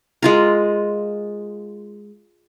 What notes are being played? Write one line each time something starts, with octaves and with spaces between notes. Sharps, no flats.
G#3 F4 A#4